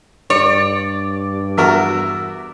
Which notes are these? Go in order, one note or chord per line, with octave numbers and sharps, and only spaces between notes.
G2 C#5 D5
E2 F#4 A#4 E5